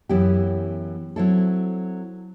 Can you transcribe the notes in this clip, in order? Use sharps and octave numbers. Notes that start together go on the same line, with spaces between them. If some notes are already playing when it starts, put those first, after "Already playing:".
F#2 E3 B3 E4 G4
F#3 C4 E4 A4